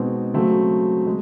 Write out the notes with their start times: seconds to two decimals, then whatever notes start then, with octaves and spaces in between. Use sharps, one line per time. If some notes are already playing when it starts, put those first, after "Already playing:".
Already playing: B2 G#3 C4 D#4
0.34 C#3 F#3 A3 C4
1.06 G#3